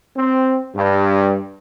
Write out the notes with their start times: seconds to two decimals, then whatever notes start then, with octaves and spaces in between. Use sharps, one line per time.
0.17 C4
0.76 G2